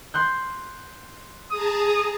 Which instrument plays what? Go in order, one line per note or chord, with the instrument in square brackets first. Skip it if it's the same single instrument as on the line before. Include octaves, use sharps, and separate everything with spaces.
[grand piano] C6 F#6 G6
[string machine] G#4 A5 A#5 [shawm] D#6